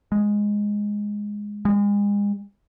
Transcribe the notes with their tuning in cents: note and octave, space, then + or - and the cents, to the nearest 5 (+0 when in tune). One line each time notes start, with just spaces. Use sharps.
G#3 -5
G#3 -35